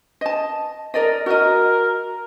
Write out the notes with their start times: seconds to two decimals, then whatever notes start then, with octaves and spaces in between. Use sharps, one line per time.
0.21 D#5 A5
0.94 A#4 D5 D#5
1.26 F#4 A#4 D#5